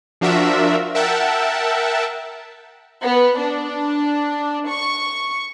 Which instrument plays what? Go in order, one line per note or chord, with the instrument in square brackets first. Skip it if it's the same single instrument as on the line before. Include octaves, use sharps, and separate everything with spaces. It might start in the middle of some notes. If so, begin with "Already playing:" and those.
[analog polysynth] F3 D4 F4 F#4 A#4 E5
A#4 E5 F#5 G5 A5
[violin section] B3
D4
C#6